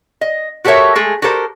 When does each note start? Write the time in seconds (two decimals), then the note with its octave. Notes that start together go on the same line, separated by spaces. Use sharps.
0.21 D#5
0.65 F#4 G4 A4 A#4 C#5 E5
0.95 G#3 A3 G#4
1.22 F#4 G4 A4 A#4 C5